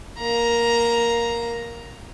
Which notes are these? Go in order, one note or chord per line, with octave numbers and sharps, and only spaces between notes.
A#3 A#5